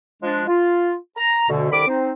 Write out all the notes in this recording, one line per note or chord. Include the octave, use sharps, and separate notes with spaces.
F3 G#3 D4
F4
A#5
D2 B2 D3
C2 D3 D#3 B5 D6
C4 D#4